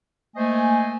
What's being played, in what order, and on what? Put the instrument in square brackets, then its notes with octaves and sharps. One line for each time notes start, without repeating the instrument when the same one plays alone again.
[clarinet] A3 [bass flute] A#3 [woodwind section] C5 D#5 G#5